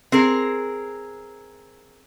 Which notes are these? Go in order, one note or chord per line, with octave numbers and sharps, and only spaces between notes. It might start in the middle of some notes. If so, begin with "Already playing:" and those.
C4 G#4 A#4